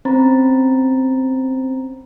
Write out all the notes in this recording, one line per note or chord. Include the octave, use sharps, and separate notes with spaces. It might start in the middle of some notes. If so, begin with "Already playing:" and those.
C4 C#4 C5 A#5 B5 A6